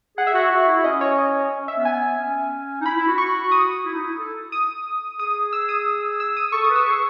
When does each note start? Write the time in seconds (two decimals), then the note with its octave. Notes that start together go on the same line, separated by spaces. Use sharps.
0.17 G#4 F#5
0.27 E5
0.34 F#4 F#5
0.50 F#4
0.67 E4
0.84 C#4 D#5
1.01 C#5
1.18 D#5
1.51 C#4
1.68 C#4 E5
1.76 B3
1.85 G#5
2.18 C#4
2.81 D#4
2.85 E4 B5
2.96 E4
3.07 F#4
3.18 F#4 C#6
3.52 D#6
3.85 E4
3.94 D#4
4.02 E4
4.18 A4
4.52 D#6
5.19 G#4 D#6
5.53 E6
5.69 D#6
6.20 E6
6.37 D#6
6.52 A4 C#6
6.64 D#6
6.70 B4
6.76 E6
6.86 G#4 C#6